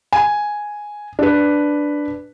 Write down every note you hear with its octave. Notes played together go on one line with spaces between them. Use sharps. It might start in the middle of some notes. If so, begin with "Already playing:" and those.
G#5
D4 B4